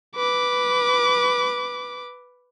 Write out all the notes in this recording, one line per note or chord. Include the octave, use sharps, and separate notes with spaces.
B4 D6